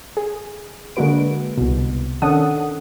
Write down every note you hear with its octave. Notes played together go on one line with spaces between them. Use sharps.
G#4
D3 G#3 A#3 F#4 B4 D7
C2 B2
D#3 C#4 D4 A4 F#5 D#6